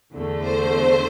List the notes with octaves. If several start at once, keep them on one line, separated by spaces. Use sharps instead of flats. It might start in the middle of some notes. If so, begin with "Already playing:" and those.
E2 D3 A3
C5